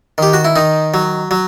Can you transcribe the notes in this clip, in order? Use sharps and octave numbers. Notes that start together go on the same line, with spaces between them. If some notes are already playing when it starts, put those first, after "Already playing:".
D#3 G4
F#4
E4
D#3 D#4
F#3
F#3